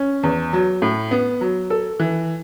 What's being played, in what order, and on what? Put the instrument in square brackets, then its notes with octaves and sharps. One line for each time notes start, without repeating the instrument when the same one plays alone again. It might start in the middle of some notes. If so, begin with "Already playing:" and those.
Already playing: [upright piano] C#4
E2
F#3
A2
B3
F#3
A4
E3